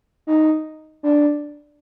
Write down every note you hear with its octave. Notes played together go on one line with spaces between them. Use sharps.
D#4
D4